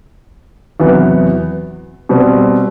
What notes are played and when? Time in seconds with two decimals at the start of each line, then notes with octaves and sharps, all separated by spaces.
0.80 E2 C3 F#3 B3
2.09 B2 G3 C4